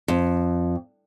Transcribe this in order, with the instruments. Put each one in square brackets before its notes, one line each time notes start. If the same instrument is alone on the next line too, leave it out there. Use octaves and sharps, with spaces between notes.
[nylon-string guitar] F2